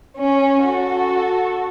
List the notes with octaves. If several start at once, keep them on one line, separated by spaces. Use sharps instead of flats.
C#4
F#4 A4